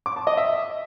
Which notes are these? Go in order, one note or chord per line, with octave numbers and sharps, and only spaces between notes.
D6
A5
D#5
E5